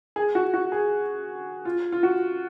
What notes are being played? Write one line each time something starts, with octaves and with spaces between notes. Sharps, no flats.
G#4
F#4
F#4
G#4
F4
F4
F#4